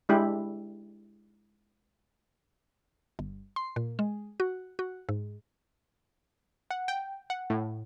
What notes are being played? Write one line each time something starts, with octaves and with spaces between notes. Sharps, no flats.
G#3 D4 E4 G4
G1
C6
A#2
G#3
F#4
F#4
G#2
F#5
G5
F#5
A2